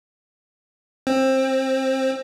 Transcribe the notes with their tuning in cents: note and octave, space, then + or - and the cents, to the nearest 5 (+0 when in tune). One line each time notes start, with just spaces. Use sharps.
C4 +20